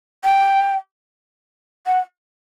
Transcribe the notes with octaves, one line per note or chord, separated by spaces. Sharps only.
G5
F#5